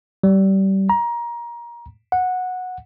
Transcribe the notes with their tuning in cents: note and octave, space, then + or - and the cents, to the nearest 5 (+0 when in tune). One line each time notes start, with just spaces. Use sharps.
G3 -25
A#5 +20
F#5 -15